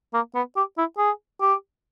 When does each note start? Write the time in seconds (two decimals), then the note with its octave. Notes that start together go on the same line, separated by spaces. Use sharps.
0.14 A#3
0.35 B3
0.56 G4
0.78 E4
0.98 G#4
1.41 G4